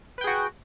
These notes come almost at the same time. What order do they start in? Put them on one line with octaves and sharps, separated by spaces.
B4 G5 G#4 F#4